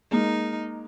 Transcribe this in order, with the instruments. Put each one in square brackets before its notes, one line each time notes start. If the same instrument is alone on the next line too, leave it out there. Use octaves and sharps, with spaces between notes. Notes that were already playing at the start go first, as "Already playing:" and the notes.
[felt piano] G#3 A#3 [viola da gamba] D#4